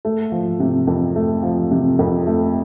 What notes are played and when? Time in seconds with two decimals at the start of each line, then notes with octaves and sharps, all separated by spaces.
0.05 A3
0.32 F3
0.60 C3
0.87 F2
1.16 A3
1.43 F3
1.71 C3
1.99 F2
2.27 A3